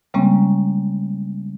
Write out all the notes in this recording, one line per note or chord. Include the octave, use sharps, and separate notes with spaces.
C#3 G3 G#3 A#3 C4 C#4